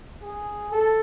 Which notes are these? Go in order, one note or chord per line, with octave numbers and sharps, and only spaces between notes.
G#4
A4